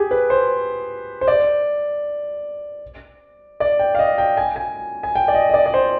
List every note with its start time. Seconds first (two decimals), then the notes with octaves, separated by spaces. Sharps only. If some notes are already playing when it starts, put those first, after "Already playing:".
Already playing: G4 G#4
0.11 B4
0.30 C5
1.21 C5
1.27 D5
3.60 D5
3.79 G5
3.95 F5
3.99 D#5
4.18 G5
4.37 G#5
4.56 G#5
5.03 G#5
5.15 G5
5.28 D5
5.35 D#5
5.49 D#5
5.54 D5
5.66 D5
5.74 C5